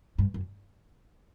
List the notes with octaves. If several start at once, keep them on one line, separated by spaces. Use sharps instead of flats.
G2
F#2